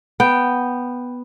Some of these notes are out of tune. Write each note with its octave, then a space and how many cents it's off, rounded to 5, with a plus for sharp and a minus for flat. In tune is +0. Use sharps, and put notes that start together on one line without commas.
B3 +0 G5 +0